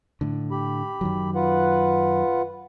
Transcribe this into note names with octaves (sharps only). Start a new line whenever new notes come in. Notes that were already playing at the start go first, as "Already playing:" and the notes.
A2 D3
G4 B5
F#2 D#3 F#3
F4 B4 F#5